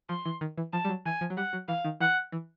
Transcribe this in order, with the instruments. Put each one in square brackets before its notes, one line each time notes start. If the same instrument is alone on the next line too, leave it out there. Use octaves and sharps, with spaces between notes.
[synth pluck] F3 [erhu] C6
[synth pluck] E3
D#3
E3
[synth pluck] F3 [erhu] A5
[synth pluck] G3
F#3
[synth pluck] E3 [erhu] G#5
[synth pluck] F3
F#3
[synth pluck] G3 [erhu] F#5
[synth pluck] F#3
[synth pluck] E3 [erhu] F5
[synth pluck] D#3
[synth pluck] E3 [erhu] F#5
[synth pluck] E3